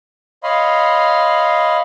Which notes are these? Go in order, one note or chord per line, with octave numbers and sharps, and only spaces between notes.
C#5 D#5 F5 B5 C6